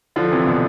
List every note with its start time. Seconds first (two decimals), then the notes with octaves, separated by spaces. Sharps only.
0.16 D3 F3
0.31 C3 E3
0.47 B2 D3